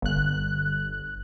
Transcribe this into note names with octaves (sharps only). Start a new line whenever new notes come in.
G1 F#6